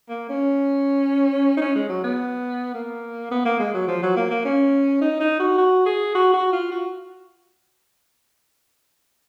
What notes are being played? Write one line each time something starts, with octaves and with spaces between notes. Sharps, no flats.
A#3
C#4
D#4
C#4
G#3
F#3
B3
A#3
B3
A#3
G#3
F#3
F3
F#3
A#3
A#3
C#4
D#4
D#4
F#4
F#4
G#4
F#4
F#4
F4
F#4